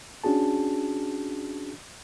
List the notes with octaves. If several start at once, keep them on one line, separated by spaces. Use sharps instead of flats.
C#4 D4 F#4 G#4 A5